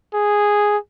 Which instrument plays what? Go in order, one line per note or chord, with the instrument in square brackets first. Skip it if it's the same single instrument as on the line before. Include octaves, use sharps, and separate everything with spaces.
[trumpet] G#4